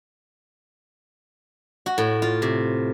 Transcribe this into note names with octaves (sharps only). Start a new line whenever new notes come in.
F#4
A2
F4
C3